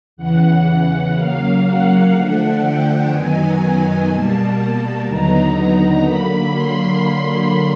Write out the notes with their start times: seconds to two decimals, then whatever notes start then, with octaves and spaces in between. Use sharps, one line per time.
0.17 E2 C#3 E3 F#5
1.14 C#3 F#3 A#3 F5
1.63 F#5
2.12 D3 F3 A3 D4
2.61 G5
3.10 F#2 D#3 F#3 B3 D#4 G#5
4.07 B2 G3 A#3 A5
5.04 D#2 D3 F#3 B3 D#4 A#5
5.54 A#5
6.03 D3 F#3 A#3 B5
6.52 C6